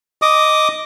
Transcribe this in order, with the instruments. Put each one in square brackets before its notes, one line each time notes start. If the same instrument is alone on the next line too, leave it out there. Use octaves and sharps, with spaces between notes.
[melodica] D#5 D6 D#6